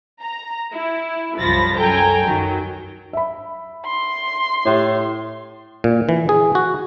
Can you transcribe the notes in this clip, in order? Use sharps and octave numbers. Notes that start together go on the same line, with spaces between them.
A#5
E4
C2 F#2 F3 B5 A6 A#6
F#2 A4 G5 G#5 A#5
F#2 D#3 F#3
E5 B5
C6
A2 G4
A#2
E3
G#4
F#4